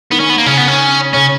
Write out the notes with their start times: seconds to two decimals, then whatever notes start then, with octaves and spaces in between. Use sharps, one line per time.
0.11 D#3 B3
0.20 C#4
0.29 B3
0.38 A#3
0.46 C#3 C#4
0.57 B3
0.68 C#4
1.14 C#3 C#4